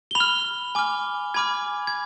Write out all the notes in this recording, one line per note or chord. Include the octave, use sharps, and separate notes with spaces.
G7
B5 F7
F6
G#5 D6 F6
G#5 B5 D6 F6 G#6
G#6